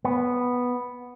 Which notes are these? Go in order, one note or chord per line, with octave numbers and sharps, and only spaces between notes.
B3